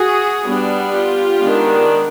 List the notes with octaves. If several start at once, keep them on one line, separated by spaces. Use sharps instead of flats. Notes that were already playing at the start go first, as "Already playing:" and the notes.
Already playing: F#4 G#4
G3 B3 D4
F4 G4
D#3 G#3 B3 D4